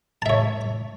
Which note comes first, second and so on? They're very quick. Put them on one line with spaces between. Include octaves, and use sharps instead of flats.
A5 E5 C#5